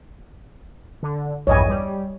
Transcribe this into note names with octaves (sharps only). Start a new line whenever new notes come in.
D3
A#1 E2 G2 C#5 D#5 G#5
G3